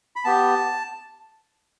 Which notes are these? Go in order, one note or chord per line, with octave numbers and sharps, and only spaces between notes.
B5
B3 G4 A5